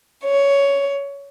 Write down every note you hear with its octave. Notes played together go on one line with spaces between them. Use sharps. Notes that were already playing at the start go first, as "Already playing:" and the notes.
C#5